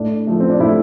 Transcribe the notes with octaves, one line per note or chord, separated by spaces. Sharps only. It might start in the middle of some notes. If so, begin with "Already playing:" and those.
Already playing: A2 D4
F3 A3
C4
D4
A2 E4